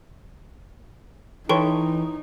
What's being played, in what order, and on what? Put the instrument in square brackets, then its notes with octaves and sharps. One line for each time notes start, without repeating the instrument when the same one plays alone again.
[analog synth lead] E3 [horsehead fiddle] D#4 [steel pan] A4 B4 C#5 [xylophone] G5 C6 C#6